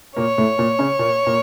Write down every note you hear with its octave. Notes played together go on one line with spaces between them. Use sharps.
A#2 A#3 C#5
A2 A3
A#2 A#3
C#3 C#4
A#2 A#3
A#2 A#3